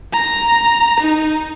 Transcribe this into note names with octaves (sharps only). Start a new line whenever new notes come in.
A#5
D#4